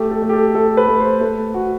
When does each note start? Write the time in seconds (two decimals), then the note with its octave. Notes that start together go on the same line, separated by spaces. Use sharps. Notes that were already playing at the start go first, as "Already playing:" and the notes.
Already playing: A3 G4
0.11 A4
0.22 A3
0.29 G4
0.33 A4
0.55 A3 A4
0.77 B4
0.88 A3
1.00 C5
1.21 A3 B4
1.54 F#4